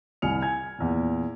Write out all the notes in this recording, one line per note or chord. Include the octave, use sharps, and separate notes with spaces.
C2 G#5 F6 C#7 F7
G#5 G#6
E2 A#2